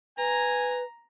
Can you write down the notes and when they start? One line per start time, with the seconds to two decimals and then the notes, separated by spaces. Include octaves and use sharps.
0.18 B4 G#5 A#5